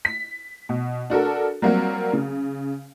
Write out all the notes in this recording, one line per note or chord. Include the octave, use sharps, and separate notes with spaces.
B6
B2
D4 F#4 A4 A#4
F#3 G3 A#3 C4 F#4
C#3